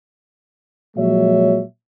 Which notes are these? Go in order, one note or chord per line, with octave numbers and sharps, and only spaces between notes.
A#2 F3 F#3 G#3 C#5 E5